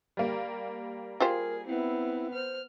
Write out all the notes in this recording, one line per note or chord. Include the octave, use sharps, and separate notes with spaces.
G3 A#3
F4 G4 G#4 A#4 C5
B3 C4 E4
C5 F6